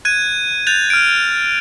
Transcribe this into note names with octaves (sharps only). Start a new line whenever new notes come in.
F#6 G#6 D#7
F#6 G6 A6 F7
F6 D7